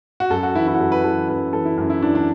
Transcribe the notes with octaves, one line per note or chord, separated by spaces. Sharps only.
F#4
F#2 A4
F#4
E3 E4
E4
F#4
F#2 A4
B4
E3 A4
F#2 B4
E3 A4
E4
F#2
E4
E3 D4
D4